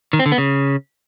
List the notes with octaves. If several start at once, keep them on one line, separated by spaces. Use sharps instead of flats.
D#3
C4
D3
B3
C#3